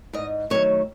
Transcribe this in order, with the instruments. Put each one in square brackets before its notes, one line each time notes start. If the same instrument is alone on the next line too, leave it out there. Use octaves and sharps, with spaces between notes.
[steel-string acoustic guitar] G#2 D#5
D#3 F#3 A3 C#5